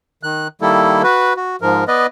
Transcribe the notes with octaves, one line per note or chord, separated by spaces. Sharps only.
D#3 F#6
D#3 G3 A#3 E4 A4
F#4 B4
F#4
G#2 F3 A#4
B3 B4 D5 D#5